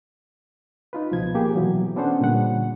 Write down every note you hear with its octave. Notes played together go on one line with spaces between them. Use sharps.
D#4 F4 B4
C#2 B2 F3 G#6
A#3 G4 G#4
B2 E3 F#3
B3 C#4 D4 A4 C5 F#5
A#2 D3 G3 F#5